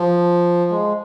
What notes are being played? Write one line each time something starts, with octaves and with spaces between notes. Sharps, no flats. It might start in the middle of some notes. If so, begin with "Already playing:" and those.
Already playing: F3
G#3